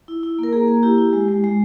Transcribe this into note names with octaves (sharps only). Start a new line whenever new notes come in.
E4
E4
A#3 A#4
A#3 G#4
A#3
E4 G4
E4
G#3
G#3
G#3